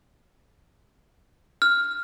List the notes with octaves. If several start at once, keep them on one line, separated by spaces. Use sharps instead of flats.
F6